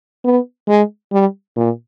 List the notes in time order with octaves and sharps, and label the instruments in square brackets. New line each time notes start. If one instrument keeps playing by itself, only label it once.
[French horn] B3
G#3
G3
A#2